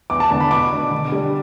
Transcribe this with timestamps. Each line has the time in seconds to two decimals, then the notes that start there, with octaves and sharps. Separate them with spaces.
0.10 E2 D6
0.20 A5
0.31 D3 B3 D4 A5
0.40 B5
0.51 B2 D6
0.71 B3 D4
0.91 D3
1.12 G3 D4